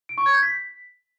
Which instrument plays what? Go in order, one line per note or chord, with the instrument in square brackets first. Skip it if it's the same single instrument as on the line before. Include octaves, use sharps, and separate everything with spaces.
[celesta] D7
C#6
G#6
G6
B6